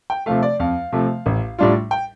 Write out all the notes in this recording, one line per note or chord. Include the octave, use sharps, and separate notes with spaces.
G5
C3 F3 A3 F5
D5
F2 F5
C3 F3 A3
A1
A2 G3 D4 F4
G5